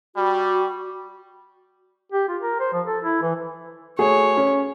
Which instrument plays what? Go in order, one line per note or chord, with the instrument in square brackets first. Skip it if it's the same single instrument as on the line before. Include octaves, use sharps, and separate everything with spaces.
[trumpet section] G3 [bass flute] F#4
[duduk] G4
F4
A#4
C5
F3
A4
E4
E3
[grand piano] A3 F#4 G#4 [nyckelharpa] C#5
[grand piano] C#4